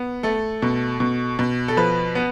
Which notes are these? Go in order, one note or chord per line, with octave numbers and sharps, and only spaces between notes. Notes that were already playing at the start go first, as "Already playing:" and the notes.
Already playing: B3
A3 A4
B2
B2
B2
A4
F3 B4
B3